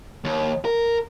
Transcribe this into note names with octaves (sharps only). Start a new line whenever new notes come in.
D#2
A#4